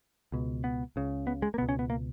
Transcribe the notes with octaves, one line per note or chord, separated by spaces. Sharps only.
C#2 B2
B3
C#2 C#3
B3
G#3
A#3
C#2 B2 B3
C#4
B3
A#3